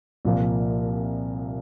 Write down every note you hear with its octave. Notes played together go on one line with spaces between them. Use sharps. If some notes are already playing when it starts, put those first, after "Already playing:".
C2 A#2 F3 A#3